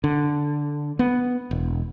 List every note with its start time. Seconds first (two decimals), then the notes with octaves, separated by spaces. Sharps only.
0.04 D3
0.99 B3
1.51 E1